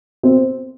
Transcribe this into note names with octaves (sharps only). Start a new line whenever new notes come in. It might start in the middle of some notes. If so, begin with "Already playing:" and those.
C4